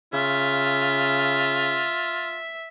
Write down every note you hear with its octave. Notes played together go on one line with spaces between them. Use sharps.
C#3 F4 E5